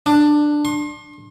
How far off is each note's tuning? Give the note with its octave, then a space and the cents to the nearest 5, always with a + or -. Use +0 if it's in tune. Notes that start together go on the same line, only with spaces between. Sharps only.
D4 +10
C6 +35